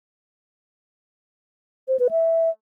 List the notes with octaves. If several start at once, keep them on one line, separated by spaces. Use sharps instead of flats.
C5
B4
E5